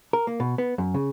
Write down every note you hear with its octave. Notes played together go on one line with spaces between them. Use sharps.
A#4
A#3
B2
B3
F#2
C#3